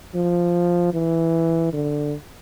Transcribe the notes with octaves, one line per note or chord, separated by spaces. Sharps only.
F3
E3
D3